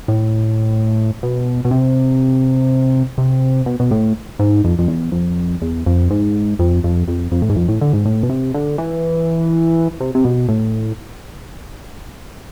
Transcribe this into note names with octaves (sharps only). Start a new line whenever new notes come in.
A2
B2
B2
C3
C3
B2
B2
A2
G#2
F2
F2
E2
F2
E2
F2
G#2
F2
F2
F2
F2
A2
G#2
F2
A2
D3
G#2
A2
B2
C3
D3
E3
C3
C3
B2
A2